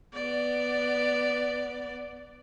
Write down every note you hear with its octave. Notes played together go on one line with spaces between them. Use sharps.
B3 D5